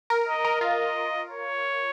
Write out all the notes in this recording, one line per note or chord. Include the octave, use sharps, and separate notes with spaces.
A#4
D#5
A#4
F4 D#5
C#5